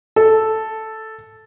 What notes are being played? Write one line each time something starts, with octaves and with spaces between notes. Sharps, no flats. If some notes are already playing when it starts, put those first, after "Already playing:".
A4